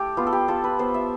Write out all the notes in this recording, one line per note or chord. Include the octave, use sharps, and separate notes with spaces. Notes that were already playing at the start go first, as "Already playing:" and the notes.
Already playing: A3 G4 A4
B3 F4
A4
G4
F4 A4
B4
B3 C5
E5